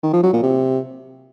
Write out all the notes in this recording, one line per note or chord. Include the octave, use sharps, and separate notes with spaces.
D#3
F3
F#3
A#2
C3